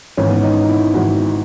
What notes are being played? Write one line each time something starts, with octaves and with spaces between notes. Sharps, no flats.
G#1 G#2 E3 C#4
B3
C#4
D#4
D#4
E4
G#1 G#2 E3 F#4